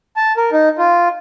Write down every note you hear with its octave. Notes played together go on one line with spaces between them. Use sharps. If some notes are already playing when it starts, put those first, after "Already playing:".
A5
A#4
D#4
F4